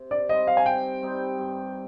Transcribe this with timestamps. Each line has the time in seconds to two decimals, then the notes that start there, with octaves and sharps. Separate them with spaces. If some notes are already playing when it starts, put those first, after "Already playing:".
Already playing: C3
0.11 D5
0.29 G3 C4 D#4 D#5
0.47 F5
0.57 G#5
0.65 C3 G5
1.02 G3 C4 D#4
1.38 G2